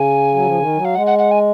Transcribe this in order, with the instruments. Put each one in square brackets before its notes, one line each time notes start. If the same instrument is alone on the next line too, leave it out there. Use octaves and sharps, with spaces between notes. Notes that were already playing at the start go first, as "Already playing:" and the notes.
Already playing: [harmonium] C#3 [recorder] G#5
[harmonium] F#3
F3
D#3
F#3
[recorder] F5
[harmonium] G#3 [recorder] F#5
[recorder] F#5
F#5
G#5